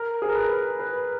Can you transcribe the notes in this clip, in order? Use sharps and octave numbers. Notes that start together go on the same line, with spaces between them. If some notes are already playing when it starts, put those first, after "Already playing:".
Already playing: A#4
G#4
A#4
B4
B4